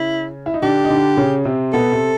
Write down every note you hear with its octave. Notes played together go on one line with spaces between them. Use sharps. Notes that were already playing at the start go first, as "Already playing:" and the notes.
Already playing: C#3 C#4 E4
E4
D#4
D3 D4 G4
D#4
D3 D4
C#3 C#4
C3 C4
B2 B3 A4
C3 C4